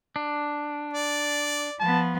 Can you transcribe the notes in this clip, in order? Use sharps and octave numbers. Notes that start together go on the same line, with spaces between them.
D4
D5
F3 B3 A5